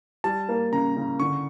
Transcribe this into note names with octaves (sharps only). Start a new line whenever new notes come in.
G3 A5
A#3
C#3 A#5
C#3
D3 C#6